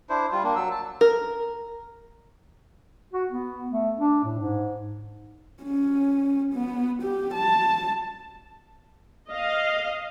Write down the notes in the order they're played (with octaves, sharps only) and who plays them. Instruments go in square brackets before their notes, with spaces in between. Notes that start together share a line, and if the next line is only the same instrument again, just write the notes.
[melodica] D4 E4 C5
G3 F4
A#3 D4
F#3 E6
A5
[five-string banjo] A#4
[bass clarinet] F#4
B3
A3
D4
A2
G#2
[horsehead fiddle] C#4
B3
G4
A5
[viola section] D#5 F5